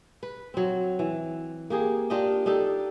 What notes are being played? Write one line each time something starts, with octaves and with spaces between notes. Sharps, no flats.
B4
F#3 C4
E3
A#3 G4 G#4
D4 F4 G4 D#5
D4 D#4 G4 A4